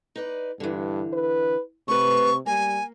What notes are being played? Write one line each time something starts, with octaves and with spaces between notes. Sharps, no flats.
D#4 B4 D5
G2 D3 E3
B4
C3 A3 B4 C#6
G3 A#3 G#5